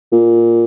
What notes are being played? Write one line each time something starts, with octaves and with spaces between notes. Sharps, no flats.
A#2